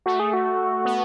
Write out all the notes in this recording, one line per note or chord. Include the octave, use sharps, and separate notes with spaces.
A3 F#4
G#4
F#4
B3